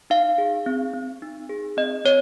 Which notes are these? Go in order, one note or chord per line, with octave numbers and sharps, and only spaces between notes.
D#4 F5
G#4
C4
C4
D#4
G#4
C4 D#5
C4 C#5